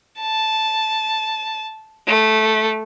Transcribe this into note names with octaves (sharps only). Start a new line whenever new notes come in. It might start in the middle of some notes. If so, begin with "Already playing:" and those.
A5
A3